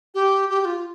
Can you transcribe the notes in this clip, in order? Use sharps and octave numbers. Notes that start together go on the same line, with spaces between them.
G4
G4
G4
F4